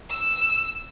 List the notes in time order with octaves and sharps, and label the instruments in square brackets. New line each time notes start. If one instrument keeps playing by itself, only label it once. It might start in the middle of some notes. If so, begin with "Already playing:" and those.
[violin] E6